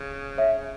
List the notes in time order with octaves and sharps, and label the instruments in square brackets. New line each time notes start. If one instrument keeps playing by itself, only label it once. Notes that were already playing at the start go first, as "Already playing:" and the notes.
Already playing: [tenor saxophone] C#3
[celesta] C#5 E5